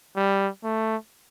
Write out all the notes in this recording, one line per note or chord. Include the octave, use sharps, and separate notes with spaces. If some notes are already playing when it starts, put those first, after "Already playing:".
G3
A3